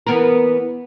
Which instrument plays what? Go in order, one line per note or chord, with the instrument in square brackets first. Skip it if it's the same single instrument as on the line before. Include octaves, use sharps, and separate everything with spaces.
[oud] E3 B3 A#4